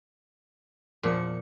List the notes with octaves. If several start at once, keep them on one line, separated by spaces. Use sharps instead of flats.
E2 A#2 F3 C#7